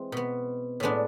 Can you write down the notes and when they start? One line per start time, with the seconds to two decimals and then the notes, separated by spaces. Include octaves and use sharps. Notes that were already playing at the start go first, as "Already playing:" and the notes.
Already playing: E3 G#3 C4
0.12 B2 B3
0.80 A2 G#3 B3 D4